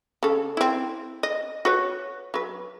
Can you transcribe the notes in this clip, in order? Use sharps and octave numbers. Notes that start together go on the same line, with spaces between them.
C#3 A4
C4 E4
D#5
F#4 B4 C#5
F#3 B4